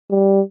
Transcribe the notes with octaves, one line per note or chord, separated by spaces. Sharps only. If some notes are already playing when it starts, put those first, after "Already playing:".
G3